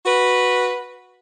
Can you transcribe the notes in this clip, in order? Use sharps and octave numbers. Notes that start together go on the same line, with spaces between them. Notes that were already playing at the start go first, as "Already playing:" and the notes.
F#4 B4